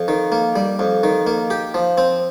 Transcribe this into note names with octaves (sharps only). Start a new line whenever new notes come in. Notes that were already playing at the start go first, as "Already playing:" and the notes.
Already playing: F2
D#3
A#3
G3
F2
D#3
A#3
G4
F3
C4